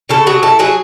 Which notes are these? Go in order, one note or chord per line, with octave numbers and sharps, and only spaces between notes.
C#3 A4
F#3 G#4
E4 A4
F#3 G#4